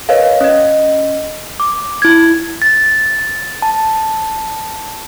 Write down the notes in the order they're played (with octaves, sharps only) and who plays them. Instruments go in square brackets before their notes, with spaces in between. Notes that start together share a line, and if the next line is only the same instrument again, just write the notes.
[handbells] A#4 B4 C#5 D#5 F5
C#4 D#5
D6
E4 G#6
[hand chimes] A6
A5